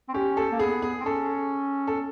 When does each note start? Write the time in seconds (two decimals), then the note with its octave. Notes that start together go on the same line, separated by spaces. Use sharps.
0.09 C4
0.14 C#4 G4
0.37 A4
0.52 A#3
0.59 B3 G#4
0.82 G#4
1.01 C4
1.05 C#4 A4
1.87 A4